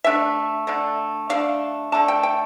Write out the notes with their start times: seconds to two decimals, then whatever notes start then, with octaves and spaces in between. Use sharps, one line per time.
0.04 D3 A3 D4 E5
0.67 D3 A3 D4
1.29 D3 A3 D4 F5
1.92 D3 A3 D4 A5
2.08 G5
2.23 G5